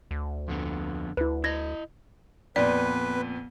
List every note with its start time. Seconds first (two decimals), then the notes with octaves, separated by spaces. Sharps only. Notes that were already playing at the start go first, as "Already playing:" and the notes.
0.11 D2
0.48 F2 D3 B3
1.17 D2 E4 B4
1.44 E4 D#5 G#6 A#6
2.56 F2 A#2 B3 B4 D5